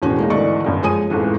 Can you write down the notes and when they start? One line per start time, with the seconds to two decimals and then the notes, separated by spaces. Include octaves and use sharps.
0.02 E1 A1 C#4 F#4
0.18 G#3 A#3 D#4
0.30 G#1 D2 E3 D5 D#5 C#6
0.64 G1 F#2 A#2
0.82 F3 G#3 C#5 G#5 D#6 D#7
1.10 A1 F2 G#2 E3